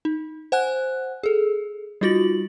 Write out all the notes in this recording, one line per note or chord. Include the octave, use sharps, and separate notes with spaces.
D#4
C5 F#5 G#5 F#6
G#4 A4
G3 D#4 F4 F#4 A6 F#7